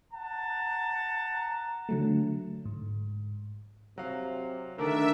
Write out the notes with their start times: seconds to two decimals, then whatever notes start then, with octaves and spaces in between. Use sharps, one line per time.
0.12 F#5 A5 A#5
1.89 D3 F#3 A3
2.65 G#2
3.98 C3 F#3 F5
4.78 D3 D#3 A3 D4 A#4 E5